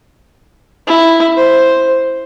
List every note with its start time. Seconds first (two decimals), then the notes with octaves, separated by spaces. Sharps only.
0.87 E4
1.36 C5